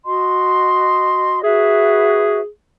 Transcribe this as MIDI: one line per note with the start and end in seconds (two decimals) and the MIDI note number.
0.07 1.42 66
0.07 1.42 75
0.07 1.42 84
1.44 2.40 66
1.44 2.47 68
1.44 2.40 71
1.44 2.40 76